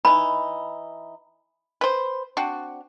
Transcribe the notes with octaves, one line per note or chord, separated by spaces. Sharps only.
E3 D#4 B5
B4 C5
C4 D4 F#4